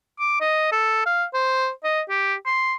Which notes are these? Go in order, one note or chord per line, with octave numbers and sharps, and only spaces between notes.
D6
D#5
A4
F5
C5
D#5
G4
C6